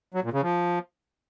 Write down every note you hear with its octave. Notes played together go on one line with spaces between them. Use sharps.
F#3
A#2
C#3
F3